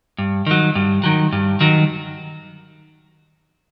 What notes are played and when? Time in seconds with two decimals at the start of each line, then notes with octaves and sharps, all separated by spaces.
0.18 G2
0.47 D#3 F#3
0.75 G2
1.04 D#3 F#3
1.33 G2
1.61 D#3 F#3